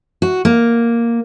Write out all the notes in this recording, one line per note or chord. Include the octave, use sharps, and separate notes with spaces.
F#4
A#3